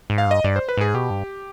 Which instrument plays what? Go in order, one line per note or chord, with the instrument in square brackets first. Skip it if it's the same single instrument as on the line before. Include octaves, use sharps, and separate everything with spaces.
[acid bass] G#2
[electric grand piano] F5
[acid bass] G2 [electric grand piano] D#5
[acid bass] G2 [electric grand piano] D5
[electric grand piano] C5
B4
[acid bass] G#2 [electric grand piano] G#4
[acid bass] B2 [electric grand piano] G4
[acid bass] G2